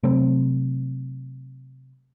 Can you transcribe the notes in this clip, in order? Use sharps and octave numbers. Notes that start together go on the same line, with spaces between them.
C3 F#3 A3 C4